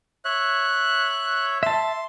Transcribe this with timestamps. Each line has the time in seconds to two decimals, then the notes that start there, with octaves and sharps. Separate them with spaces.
0.25 C#5 E5 F#6
1.63 E5 A5 C6